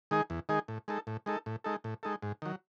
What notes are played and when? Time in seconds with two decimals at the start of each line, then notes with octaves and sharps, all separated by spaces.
0.11 D#3 G#3 D#4 G#4
0.30 E2
0.49 D#3 G#3 D#4 G#4
0.68 A2
0.88 G#3 D#4 A4
1.07 A2
1.26 G#3 D#4 A4
1.46 A2
1.64 G#3 D#4 A4
1.84 A2
2.03 G#3 D#4 A4
2.22 G#2
2.42 D#3 F#3